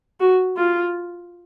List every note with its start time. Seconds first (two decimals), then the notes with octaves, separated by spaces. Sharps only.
0.20 F#4
0.57 F4